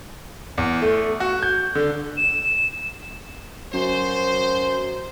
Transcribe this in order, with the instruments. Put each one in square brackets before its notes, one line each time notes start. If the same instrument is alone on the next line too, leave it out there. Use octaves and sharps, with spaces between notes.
[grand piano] E2
A3
F#4
G6
D3
[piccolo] E7
[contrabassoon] F#2 [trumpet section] C5